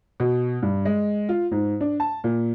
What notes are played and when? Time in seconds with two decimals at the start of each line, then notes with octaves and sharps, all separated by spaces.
0.20 B2
0.62 G2
0.85 G#3
1.29 F4
1.52 G#2
1.81 D4
2.00 A5
2.24 A#2